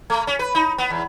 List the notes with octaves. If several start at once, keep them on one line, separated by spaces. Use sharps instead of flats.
A3
C#4
B4
D#4
B3
E2